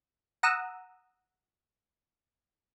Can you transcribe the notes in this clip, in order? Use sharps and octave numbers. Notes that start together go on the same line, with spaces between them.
F#5 A#5 D#6 E6